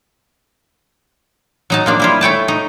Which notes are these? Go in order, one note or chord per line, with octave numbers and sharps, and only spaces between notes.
F#3 D#4 A5
F3 A#3 D4
G3 E4 F4
A3 C#5 G5 A5
D#4